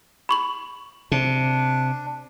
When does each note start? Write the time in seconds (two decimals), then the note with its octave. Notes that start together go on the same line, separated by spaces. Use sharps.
0.29 B5 C#6 F#7
1.12 C3 D4